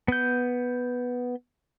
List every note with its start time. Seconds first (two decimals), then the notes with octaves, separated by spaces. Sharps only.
0.08 B3 G6